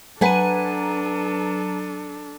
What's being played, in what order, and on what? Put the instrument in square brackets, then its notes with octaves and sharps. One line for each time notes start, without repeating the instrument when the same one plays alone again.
[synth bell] F#3 A#5 D#7 [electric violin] D4 A4 [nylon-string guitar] B4 F#5 G#5